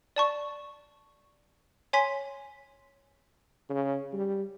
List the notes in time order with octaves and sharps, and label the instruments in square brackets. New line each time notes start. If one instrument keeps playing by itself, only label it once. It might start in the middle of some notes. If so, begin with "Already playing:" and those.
[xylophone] D5 A5 C#6
C#5 G#5 C6 B6
[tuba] C#3
G3